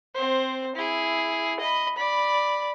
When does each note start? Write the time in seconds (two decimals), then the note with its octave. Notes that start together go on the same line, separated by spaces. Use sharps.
0.15 C4 C5
0.76 E4 G#4
1.60 D#5 B5
1.96 D5 B5